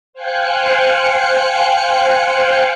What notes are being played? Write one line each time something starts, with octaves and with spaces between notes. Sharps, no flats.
C5 F5 G5 G#5 F#6 C#7